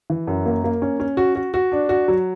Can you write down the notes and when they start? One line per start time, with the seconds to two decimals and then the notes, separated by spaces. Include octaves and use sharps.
0.10 E3
0.27 F#2
0.46 A#3
0.64 A#3
0.82 C#4
1.00 C#4
1.17 F#4
1.35 F#4
1.54 F#4
1.72 D4
1.89 F#4
2.08 F#3